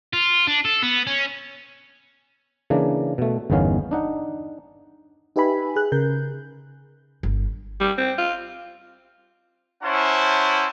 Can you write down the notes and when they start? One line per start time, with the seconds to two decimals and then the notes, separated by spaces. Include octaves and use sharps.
0.13 F4
0.47 D4
0.65 A4
0.82 B3
1.07 C#4
2.70 C#3 E3 A#3 D4
3.18 B2 A3
3.50 G1 E2 D#3 B3 C#4 F5
3.91 D4 D#4 F#5
5.36 D#4 G4 B4 E5 G#5 B5
5.76 G#4 F#6
5.92 C#3 A#4 G6
7.23 G1
7.80 G3
7.98 C4
8.18 F4
9.84 C#4 E4 C5 C#5 F#5 A5